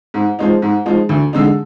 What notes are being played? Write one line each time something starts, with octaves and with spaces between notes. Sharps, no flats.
G#2
F3 G#3 D#4
G#2
F3 G#3 D#4
D2
D3 G#3 D#4